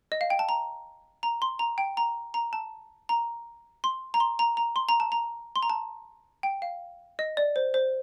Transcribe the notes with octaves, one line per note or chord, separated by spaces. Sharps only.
D#5
F5
G5
A5
A#5
A#5
C6
A#5
G5
A#5
A#5
A5
A#5
C6
A#5
C6
A#5
A#5
C6
A#5
A5
A#5
C6
A#5
A5
G5
F5
D#5
D5
C5
C5